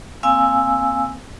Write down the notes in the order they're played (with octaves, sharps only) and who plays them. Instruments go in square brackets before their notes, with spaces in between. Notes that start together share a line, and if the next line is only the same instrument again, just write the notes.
[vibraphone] A#3 C4 F5 G#5 E6